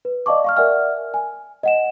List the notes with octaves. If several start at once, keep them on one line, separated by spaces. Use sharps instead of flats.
B4
D5 D#5 F5 A5 C#6 D6
F5 C#6 F6
A#4 D5 E5 F#5 G#5 F6
G#5
D#5 F#5 E7